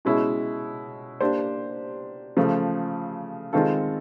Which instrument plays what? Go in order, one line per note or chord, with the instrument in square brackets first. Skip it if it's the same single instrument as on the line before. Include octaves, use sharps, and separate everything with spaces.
[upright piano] B2 G#3 C#4 E4
A#3 D4 G4 C5
C#3 F3 A3
D#3 G#3 C4 F4 A4